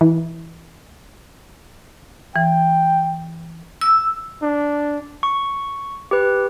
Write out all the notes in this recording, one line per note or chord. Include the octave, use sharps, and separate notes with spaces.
E3
E3 G5
E6
D4
C#6
G4 B4